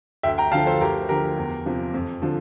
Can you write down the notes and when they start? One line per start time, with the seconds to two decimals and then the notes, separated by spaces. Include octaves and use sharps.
0.23 D2 E5 G5
0.38 G5 A#5
0.52 D3 F3 F5 A5
0.66 A4 C5
0.81 D2 G4 A#4
1.09 D3 F3 G4 A#4
1.37 E2
1.66 C3 F3
1.94 F2
2.22 D3 F3